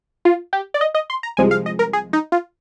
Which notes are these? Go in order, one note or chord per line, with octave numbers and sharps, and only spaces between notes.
F4
G4
D5
D#5
D#5
C6
A#5
C2 C3 F3 G#3 G#5
F5
D#5
A#4
G#4
D#4
F4